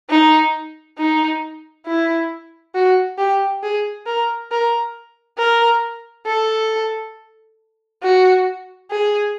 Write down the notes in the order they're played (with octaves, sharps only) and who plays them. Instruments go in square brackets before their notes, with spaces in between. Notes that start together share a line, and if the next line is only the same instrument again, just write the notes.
[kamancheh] D#4
D#4
E4
F#4
G4
G#4
A#4
A#4
A#4
A4
F#4
G#4